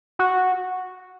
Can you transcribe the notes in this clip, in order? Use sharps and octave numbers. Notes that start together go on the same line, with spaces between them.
F#4